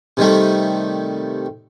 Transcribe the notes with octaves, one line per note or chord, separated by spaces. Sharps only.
C3 D#3 G3 A3